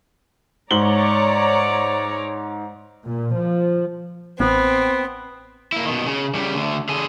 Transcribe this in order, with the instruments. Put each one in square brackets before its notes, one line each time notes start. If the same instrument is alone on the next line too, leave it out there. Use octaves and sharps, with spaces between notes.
[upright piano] G#2 F#7 G7 [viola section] C#5 D5 A#5
[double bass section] A#2
F3
[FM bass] A1 [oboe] B3 [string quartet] C4
[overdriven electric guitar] A#3 E4
B2 D#3
C#3
C#3 G3
D2 D3
D3 G#4